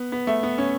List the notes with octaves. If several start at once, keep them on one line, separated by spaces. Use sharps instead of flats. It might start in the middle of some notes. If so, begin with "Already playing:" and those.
Already playing: B3
B3
A3
B3
C#4